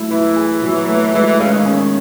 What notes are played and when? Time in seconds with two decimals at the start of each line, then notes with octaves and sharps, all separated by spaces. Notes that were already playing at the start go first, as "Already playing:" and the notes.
Already playing: F#3 A3 E4
0.10 E3 E4
0.36 G#4
0.62 F#3
0.89 A3
1.14 E3 G#3
1.27 E3
1.40 C#3 G#3
1.53 D#3
1.66 C#4